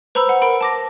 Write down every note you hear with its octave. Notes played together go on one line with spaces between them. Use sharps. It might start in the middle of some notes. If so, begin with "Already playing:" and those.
B4 C5 A#5 B5 E6
F#5
A#4 B5 D7
A5 D6 A#6